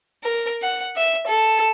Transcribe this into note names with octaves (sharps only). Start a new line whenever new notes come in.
A#4
F#5
E5
A4